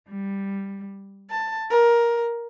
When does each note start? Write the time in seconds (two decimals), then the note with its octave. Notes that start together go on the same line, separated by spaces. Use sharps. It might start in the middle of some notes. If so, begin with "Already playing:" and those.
0.10 G3
1.30 A5
1.69 A#4